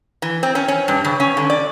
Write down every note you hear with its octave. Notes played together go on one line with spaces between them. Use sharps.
E3
C4
C#4
C#4
G2
C#3
C#4
D3
D5